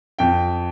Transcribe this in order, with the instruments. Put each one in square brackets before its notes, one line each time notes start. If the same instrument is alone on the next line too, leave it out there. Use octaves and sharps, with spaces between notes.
[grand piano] F2 G5